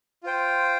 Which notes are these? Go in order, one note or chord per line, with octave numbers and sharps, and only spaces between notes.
F4 C5 G5